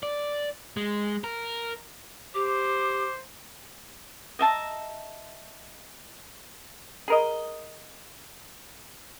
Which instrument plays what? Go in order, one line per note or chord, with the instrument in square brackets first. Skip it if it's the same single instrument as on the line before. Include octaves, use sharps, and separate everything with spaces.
[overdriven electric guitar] D5
G#3
A#4
[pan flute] G4 [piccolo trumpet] C5 [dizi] D6
[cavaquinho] D#5 E5 A5 A#5
[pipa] G#4 A#4 D#5